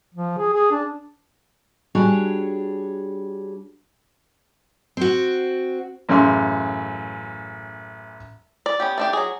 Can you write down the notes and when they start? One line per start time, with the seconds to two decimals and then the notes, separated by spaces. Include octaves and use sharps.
0.14 F3
0.38 G#4
0.54 G#4
0.71 D4
1.95 G3 D4 F#4 G#4 C#5
4.97 C4 F#4
6.09 A1 F#2 C#3 C6
8.66 D5
8.80 B3 C#4 G4
8.98 A3 D4 G4
9.13 F#3 G#4